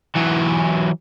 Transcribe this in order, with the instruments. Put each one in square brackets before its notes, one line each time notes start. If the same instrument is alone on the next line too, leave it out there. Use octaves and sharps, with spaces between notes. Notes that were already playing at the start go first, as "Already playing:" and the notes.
[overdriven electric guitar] E3 F#3